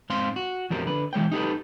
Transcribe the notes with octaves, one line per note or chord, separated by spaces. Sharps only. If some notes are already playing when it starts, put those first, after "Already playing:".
G#2 C4 F5 C6
F#4
F2 F3 G4 A#4
D3 B4
E3 G#3 C#5 G5
D#4 G4 A4 B4